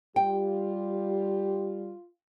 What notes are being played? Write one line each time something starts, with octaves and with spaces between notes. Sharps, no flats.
G3 F4 G4 G5